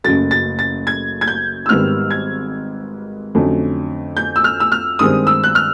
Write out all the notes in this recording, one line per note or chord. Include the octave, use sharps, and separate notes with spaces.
F#1 F#2 C#3 F#3 A3 A6
A6
A6
G#6
G#6
G6
E6
G#1 G#2 D#3 G3 B3 F6
G#6
F2 D3 F#3 A3 C#4
G6
E6
F6
E6
F6
G2 D#3 G#3 C4 D#6
E6
F#6
F6